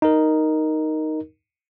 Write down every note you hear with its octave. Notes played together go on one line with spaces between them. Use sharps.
D#4 A#4